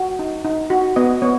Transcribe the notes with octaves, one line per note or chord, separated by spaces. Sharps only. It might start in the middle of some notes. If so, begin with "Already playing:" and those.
Already playing: F#4
D#4
D#4
F#4
B3 D#5
B3 C#5